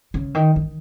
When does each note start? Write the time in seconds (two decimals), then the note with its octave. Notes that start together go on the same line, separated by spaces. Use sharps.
0.14 C#3
0.35 D#3
0.56 D#3